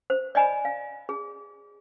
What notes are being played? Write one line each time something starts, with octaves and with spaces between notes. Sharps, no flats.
C5
D5 D#5 G#5 A#5 B5
F5
G#4